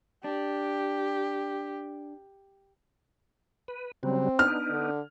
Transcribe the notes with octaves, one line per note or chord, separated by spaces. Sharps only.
D4 G4
B4
C#3 F#3 G3 C4
B3 D4 D#4 F6
D3